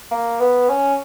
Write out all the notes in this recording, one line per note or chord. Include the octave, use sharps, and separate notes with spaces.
A#3
B3
C#4